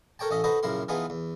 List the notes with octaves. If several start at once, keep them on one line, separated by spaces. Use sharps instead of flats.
A4 A#4 C#5 G5 A5
A1 C#4 A4 D#5 E5
D#4 F#4 A4 B4 C5 D#5
A#1 F#2 C#3 E4 A#4 C6
E3 F3 B3 D#4 F4 G#4
E2